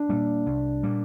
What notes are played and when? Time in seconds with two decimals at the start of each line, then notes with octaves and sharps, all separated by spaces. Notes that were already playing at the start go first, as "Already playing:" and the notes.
Already playing: D4 D5
0.09 A#2 G3 A#3
0.46 C2
0.83 A#2 G3 A#3